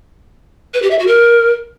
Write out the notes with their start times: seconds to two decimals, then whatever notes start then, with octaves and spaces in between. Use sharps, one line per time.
0.74 B4
0.82 G4
0.91 E5
0.99 F#4
1.07 A#4